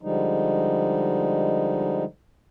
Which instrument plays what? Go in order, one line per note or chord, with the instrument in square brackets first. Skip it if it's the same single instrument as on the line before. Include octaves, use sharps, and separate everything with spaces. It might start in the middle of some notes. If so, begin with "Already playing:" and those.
[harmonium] D3 F3 G3 G#3 D#4